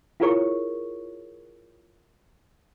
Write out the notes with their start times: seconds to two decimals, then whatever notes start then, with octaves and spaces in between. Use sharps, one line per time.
0.20 E4 F4 G#4 A#4 C#5 C#6